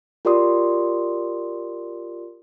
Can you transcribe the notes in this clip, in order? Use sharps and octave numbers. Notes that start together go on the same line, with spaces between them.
F4 G4 A#4 D5 C6 D#6